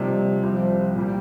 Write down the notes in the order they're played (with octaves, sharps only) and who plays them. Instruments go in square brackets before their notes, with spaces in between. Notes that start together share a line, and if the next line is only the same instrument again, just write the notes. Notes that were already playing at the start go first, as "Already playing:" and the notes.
Already playing: [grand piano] C3 F3 A#3 D#4 [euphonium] G3
[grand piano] C2 C3 G3 C4 [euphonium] F3
[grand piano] A#2 G3 A#3